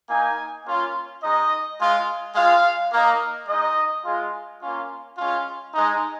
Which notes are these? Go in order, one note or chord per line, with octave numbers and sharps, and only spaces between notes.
A#3 D#4 G#5
A#3 C#4 F4
G#3 D#4 D#5
G#3 F4
G#3 F4 F5
A#3 D#4
G#3 D#4 D#5
G#3 F4
A#3 C#4 F4
G#3 C#4 F4
G#3 D#4